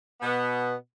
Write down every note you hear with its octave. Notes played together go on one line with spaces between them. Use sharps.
B2 B3